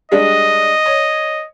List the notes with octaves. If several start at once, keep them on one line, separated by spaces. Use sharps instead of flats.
G3 G#3 D4 D#5
C#5